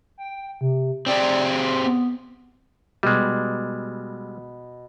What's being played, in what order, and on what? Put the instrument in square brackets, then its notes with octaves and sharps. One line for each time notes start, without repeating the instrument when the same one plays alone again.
[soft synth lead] G5
C3
[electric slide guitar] C4 G4 G#4 [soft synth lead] D5
[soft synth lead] C6
B3
[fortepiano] B2 [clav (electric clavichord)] G3 G#3